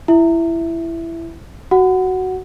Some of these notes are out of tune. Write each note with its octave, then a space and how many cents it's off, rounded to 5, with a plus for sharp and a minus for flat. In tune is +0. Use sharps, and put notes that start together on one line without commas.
E4 +15 E5 +0
F#4 +10 F#5 +0